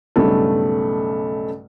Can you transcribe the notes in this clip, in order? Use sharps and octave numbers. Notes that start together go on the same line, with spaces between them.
B1 G2 C#3 A3